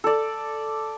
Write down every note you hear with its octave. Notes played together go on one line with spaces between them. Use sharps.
A4 D5